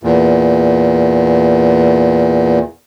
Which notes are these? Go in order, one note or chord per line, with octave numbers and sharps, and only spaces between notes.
E2 A#2